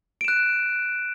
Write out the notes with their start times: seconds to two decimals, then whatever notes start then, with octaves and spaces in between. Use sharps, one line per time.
0.21 D7
0.24 E7
0.28 F#6